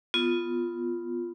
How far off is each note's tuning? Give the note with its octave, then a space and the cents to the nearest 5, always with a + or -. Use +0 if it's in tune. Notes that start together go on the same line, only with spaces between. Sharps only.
B3 +0 F4 +0